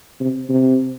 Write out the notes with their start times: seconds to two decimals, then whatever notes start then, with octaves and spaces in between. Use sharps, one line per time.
0.21 C3
0.49 C3